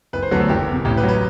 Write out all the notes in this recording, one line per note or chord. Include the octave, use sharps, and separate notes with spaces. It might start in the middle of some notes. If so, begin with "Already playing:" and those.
F#1 B4
C5
E2 D3 F#3 A3 B4
A4
F#1 G4
E2 C3
A1 G4
B4
F#3
B4